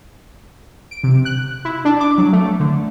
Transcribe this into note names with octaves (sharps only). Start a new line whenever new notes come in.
D7
C3
F#6
E4
D4
D6
F#3
A3
D3